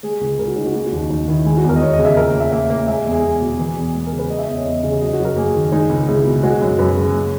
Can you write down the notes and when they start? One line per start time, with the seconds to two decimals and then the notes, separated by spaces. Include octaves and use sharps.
0.03 G#3 G#4
0.21 C#2
0.39 C#2 A#4
0.48 F#4
0.56 C#3 D#4
0.66 F#4
0.74 A#3 G#4
0.86 F#4
0.92 D#2
0.98 D#4
1.10 D#2 D#4
1.28 D#3 E4
1.45 G#3 E4
1.57 F#4
1.64 E2
1.69 A#4
1.76 D#5
1.81 E2 C#5
1.93 D#5
1.99 C#3
2.05 E5
2.17 A#2 A#4
2.34 A#2
2.40 E5
2.52 A#3 E5
2.70 A#3
2.88 G#3 E5
3.06 E2
3.12 G#4
3.24 E2
3.41 B2
3.59 E3
3.77 E2
3.94 G#3 G#4
4.06 A#4
4.13 C#3
4.19 B4
4.30 G#3 D#5
4.39 E5
4.48 E2 D#5
4.57 C#5
4.65 E2 D#5
4.83 C#3
5.01 F#3 D#5
5.13 F#4
5.19 F#2
5.25 A#4
5.37 A#3 G#4
5.49 G#4
5.54 D#3
5.72 G#3 D#4
5.90 C#2
6.08 C#2 E4
6.26 B2
6.43 G#3 F#4
6.61 F#2
6.79 F#2 B4
6.97 C#3
7.14 A#3